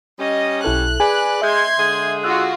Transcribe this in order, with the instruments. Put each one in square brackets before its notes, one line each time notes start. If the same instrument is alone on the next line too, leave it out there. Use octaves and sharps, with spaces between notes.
[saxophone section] G3 C#4 [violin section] D#5
[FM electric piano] B1 E4 A4 [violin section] F#6
[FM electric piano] G#4 G#5 [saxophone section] B4 D5
[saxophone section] G#3 [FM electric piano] E5 G6 [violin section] C6 G#6
[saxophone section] D3 G#3 G#4
[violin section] F4 F#4 [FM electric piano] E6 F#6